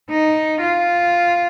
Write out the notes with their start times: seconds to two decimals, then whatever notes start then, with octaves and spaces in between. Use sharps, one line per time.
0.10 D#4
0.60 F4